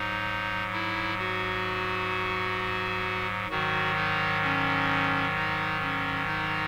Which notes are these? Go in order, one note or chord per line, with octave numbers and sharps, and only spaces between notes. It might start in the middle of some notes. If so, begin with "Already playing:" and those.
Already playing: G#2 F#3 D#4
E4
F#4
G#2 D#3 F#3 F#4
D#4
C#4
D#4
C#4
D#4